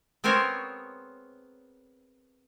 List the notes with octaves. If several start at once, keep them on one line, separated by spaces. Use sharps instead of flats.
B3 C4 G#4 A#4 C#5